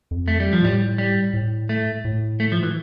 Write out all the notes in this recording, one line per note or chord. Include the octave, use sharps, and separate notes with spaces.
F2
A3
G3
F3
A2 G3
G3
A2
A3
A2
A3
F3
E3